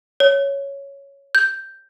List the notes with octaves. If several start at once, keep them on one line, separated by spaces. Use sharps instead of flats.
C#5
G6